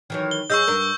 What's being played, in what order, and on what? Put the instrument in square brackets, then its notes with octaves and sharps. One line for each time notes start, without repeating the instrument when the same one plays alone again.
[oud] D#3 E3 F#3
[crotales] G7
[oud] F#2 G#4 D#5 [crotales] C#6 E6 G6
[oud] G2 D4 A#4